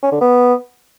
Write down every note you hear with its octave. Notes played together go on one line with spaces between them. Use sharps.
C#4
D3
B3